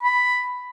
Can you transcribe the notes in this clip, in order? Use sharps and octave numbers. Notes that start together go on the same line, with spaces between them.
B5